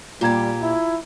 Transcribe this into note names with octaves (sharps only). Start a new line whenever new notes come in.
A#2 G3 F4 G4 A#5 G#6
E4